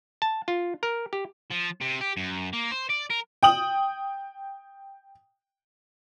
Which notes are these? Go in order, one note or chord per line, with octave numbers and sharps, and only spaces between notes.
A5
F4
A#4
G4
F3
C3
G4
F#2
A#3
C5
D5
A#4
G5 D#6 F#7